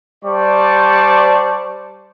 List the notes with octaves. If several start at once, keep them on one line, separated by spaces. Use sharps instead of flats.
G3 C5 D5 A5 C#6